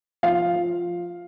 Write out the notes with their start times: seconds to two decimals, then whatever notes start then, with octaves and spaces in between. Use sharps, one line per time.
0.23 F3 F5
0.55 F3